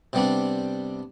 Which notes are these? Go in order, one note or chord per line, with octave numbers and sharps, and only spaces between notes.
C3 G3 B3 D4